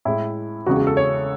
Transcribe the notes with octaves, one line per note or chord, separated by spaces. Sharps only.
A2 G#3 E4
E2 C#3 G#3 F#4
G#4
A4
C#5